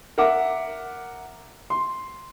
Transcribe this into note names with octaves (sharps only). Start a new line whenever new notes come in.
A#4 E5 F#5 D6
C6